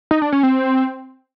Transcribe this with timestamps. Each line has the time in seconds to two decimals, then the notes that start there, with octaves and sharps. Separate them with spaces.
0.11 D#4
0.22 D4
0.32 C#4
0.43 C4